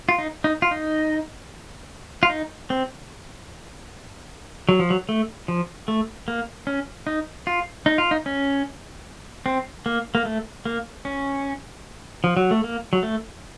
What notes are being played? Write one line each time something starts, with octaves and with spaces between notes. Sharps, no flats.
F4
D#4
D#4
F4
D#4
F4
D#4
C4
F#3
F3
F#3
A3
F3
A3
A#3
C#4
D#4
F4
D#4
F4
D#4
C#4
C4
A#3
A#3
A3
A#3
C#4
F3
F#3
A3
A#3
F#3
A3